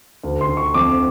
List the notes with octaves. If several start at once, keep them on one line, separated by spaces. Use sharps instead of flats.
D2
C6
D3
C#6
F2 D6